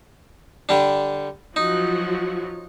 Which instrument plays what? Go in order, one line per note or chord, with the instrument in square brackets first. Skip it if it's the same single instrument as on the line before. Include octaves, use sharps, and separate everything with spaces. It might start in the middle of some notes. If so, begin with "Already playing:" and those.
[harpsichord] D3 G3 D4
[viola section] F3 F#3 F#4 [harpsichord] D#4